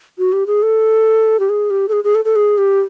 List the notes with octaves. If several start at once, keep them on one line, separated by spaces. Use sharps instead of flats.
F#4
G4
G#4
A4
G4
G#4
G4
A4
G#4
G#4
A4
A4
G#4
G4